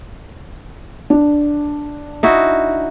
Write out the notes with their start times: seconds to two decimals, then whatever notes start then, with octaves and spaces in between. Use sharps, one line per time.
1.10 D4
2.23 D#4 E4 F#4